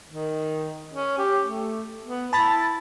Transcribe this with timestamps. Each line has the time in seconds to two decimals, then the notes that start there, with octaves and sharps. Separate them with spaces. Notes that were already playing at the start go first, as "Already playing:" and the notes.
0.08 D#3
0.94 C#4
1.18 G4
1.44 A3
2.06 B3
2.33 E4 A5 B5 A6